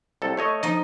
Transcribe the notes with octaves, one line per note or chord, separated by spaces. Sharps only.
C2 A4
A3 C#5 D#5
F3 D#4 D#5